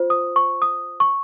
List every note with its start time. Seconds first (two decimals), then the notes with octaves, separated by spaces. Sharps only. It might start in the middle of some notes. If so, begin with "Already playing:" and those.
Already playing: F4 C5
0.10 D#6
0.36 C#6
0.62 D#6
1.00 C#6